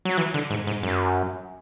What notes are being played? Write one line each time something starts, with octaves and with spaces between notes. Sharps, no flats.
F#3
E3
D3
G#2
G#2
F#2